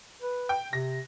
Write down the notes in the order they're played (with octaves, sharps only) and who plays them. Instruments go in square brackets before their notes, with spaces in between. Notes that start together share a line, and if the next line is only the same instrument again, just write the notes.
[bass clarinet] B4
[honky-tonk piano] G5
[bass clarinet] C3 [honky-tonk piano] A#6